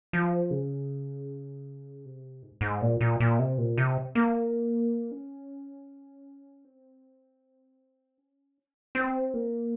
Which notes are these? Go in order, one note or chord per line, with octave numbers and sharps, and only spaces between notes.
F3
C#3
C3
G#2
G#2
A#2
A#2
A#2
C3
A#2
C3
A#3
C#4
C4
C#4
C4
A#3